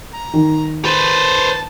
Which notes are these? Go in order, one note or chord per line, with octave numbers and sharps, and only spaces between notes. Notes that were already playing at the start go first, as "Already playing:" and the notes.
A#5
D#3
B4 C5 A5